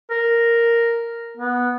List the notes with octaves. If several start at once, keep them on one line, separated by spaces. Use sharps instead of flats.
A#4
B3